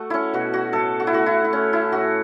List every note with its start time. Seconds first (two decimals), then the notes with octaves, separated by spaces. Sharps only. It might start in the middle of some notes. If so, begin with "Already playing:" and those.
Already playing: A3 F#4 A4
0.10 C#4 E4
0.34 B2 F#4
0.53 F#4
0.73 A2 A4
1.00 F#4
1.07 E4
1.13 A3 F#4
1.26 E4
1.44 E4
1.53 A3 C#4
1.73 E4
1.92 A2 F#4